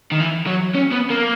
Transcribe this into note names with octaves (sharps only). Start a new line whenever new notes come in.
D#3
E3
F#3
C#4
B3
A#3